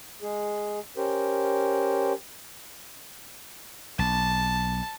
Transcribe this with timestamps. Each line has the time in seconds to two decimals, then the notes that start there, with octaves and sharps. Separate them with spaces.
0.22 G#3 G#4
0.97 C#4 G4 A#4 C5
3.99 B1 A5